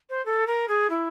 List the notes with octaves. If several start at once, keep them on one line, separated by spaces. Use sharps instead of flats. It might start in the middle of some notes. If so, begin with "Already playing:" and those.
C5
A4
A#4
G#4
E4